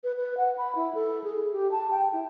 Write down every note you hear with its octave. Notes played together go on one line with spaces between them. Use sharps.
B4
B4
F#5
B5
E4
A4
G#4
G4
A5
G5
E4